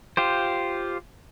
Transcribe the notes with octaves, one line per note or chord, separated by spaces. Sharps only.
F4 G4 C5